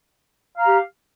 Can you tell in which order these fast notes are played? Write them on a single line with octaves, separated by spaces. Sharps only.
F5 A#5 G4